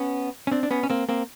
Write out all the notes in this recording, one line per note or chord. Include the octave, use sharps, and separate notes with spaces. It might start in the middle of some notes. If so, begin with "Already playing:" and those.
Already playing: B3 C#4
C#4
C4 D4
D4
B3 C#4
C#4
A#3 C4
A#3 C4